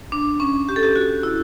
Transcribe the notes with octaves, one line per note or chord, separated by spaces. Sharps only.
D4
C#4
G4
A4
G4
F#4
E4